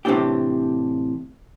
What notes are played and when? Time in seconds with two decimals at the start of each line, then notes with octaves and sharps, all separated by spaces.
0.05 A2 C3 E3 C4 D4 G4